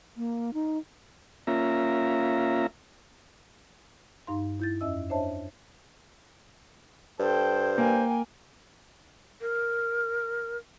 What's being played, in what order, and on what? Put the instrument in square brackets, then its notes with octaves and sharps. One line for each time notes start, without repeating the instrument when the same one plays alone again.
[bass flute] A#3
D#4
[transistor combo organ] A#3 C#4 F4 E5 A#5
[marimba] G2 D#4 F5 C6
E4 G6 A6
F2 C#4 D#5 E5 E6
D4 C5 C#5 D#5 E5 A5
[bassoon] G2 [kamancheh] A4 G5 [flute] C5
[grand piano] A#3 [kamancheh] G5 G#5
[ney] A#4